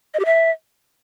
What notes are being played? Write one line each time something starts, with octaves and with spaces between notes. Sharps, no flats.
D#5
G4
E5